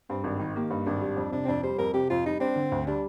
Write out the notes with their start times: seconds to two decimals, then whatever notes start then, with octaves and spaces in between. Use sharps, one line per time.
0.09 G2 C4
0.24 G#1 D4
0.39 D#3 D#4
0.56 A#3 G4
0.70 G2 D#4
0.86 G#1 D4
1.02 G3
1.17 F2
1.32 C3 D4
1.45 C4
1.48 F2 D4
1.63 G3 C5
1.78 F2 A#4
1.94 C3 G4
2.10 F2 F4
2.26 G3 D#4
2.40 C4 D4
2.56 D3
2.72 D2
2.87 G3 D4